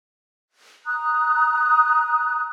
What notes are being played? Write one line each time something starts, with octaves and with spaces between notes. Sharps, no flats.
A#5 D#6 F#6